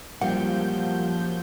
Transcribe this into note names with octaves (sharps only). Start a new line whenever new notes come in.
F#2 A#2 F3 G3 F5 F#5 G6